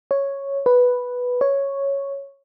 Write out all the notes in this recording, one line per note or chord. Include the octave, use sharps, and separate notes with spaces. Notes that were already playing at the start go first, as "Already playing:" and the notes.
C#5
B4
C#5